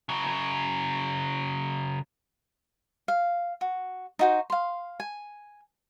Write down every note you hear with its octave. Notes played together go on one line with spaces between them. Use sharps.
C#3 F#3
F5
F#4
D#4 F#4 C5
F5 C6
G#5